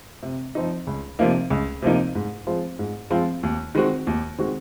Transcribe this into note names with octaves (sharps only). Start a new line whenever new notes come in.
C3
F3 C4 D#4
C#2
C3 F3 A#3 D#4
C#2
C3 F3 A#3 D#4
G#2
F3 G#3 C4 F4
G#2
F3 G#3 C4 F4
D#2
D#3 G#3 C4 F#4
D#2
D#3 G#3 C4 F#4